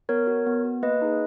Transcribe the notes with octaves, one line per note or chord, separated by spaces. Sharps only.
B3 A#4 C#5
F#4
B3
F#4
A#3 B4 D#5
D#4 G#4